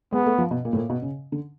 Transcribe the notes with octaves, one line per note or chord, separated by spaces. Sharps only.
G#3 B3
A3
F3
B2
A#2
A2
A#2
B2
C#3
D3